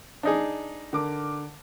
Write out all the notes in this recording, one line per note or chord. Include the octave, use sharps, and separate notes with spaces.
D4 D#4 G#4
D3 A#4 D6